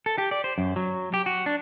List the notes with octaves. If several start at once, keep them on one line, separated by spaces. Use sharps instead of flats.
A4
G4
D5
C5
F#2
F#3
G4
F#4
D4